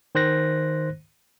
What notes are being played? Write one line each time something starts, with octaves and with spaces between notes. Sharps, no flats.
D#3 C5 F#6 A#6